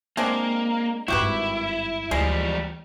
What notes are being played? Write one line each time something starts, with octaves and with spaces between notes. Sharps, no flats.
G#3 A#3 C4 D4
G#1 G2 E4 F#4 G4 B4
D2 E3 F3 G3 G#3